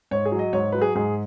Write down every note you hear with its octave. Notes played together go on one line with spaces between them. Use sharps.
G#2 C#5
G#4
F#3
D#5
G#2 C#5
F#3 B4
G#4
G#2 G#4